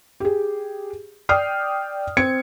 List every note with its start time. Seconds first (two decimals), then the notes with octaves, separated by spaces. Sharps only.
0.20 G4 G#4
1.29 D5 G5 D#6 F6 C7
2.17 C4 G#6 C#7